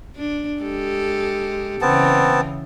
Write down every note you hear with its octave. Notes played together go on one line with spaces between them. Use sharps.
D4
G#3 G4 A4
C#3 E3 B3 C4 A5